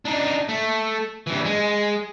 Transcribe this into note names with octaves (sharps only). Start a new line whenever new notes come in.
D4 D#4
A3
G2 E3
G#3